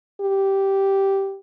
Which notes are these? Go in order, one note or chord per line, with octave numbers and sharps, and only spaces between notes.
G4